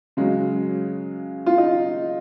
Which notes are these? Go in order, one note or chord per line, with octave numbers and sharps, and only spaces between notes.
C#3 F#3 G#3
F4
D#4